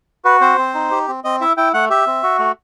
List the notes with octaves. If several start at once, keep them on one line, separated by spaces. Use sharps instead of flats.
F#4 B4
C4 C5
C4
D#4
G4
C4
C4 D#5
E4 E5
E4 G5
A3 F#5
G4 E5
C4
F#4
A3